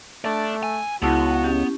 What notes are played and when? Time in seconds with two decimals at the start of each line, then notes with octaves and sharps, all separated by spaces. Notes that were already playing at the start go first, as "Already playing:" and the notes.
0.25 A3 D5 A5
0.63 G#5 E6
1.02 C#2 B3 E4 F#4 A5
1.44 C#4 G4